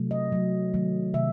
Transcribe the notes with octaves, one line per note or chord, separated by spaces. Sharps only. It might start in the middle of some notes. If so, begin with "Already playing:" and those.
Already playing: C3 F#3 A3
D#5
C3 F#3 A3
C3 D#3 F#3 A3
C3 D#3 F#3 A3 E5